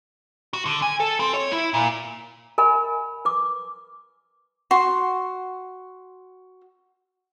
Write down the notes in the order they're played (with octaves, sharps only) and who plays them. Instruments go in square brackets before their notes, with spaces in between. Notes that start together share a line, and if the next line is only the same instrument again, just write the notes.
[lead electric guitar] F#4
D3
G#5
A4
C4
C#5
E4
A#2
[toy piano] A#4 D#5 G#5 B5
B4 D6
[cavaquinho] F#4 C6